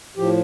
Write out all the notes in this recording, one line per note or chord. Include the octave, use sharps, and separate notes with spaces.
A2 F3 G4